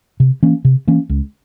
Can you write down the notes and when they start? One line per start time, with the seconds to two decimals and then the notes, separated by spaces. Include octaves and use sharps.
0.20 C3
0.43 E3 A#3 C#4
0.65 C3
0.87 E3 A#3 C#4
1.09 C#2